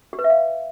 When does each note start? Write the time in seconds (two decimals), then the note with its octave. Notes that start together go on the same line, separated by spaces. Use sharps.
0.13 G4
0.19 B4
0.24 E5
0.30 F5